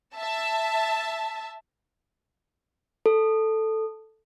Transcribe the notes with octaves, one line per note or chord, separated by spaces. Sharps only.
E5 A5
A4